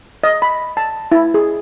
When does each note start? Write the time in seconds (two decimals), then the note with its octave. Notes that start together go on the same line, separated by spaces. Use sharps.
0.23 D#5
0.42 B5
0.77 A5
1.12 E4
1.34 G#4